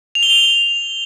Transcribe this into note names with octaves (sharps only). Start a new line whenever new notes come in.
F7
G7
F7